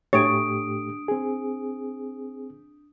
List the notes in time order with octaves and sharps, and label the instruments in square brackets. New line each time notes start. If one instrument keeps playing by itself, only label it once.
[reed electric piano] A2 A3 G4 [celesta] D4 D#6 D7 [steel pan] C#5
[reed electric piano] C4 G#4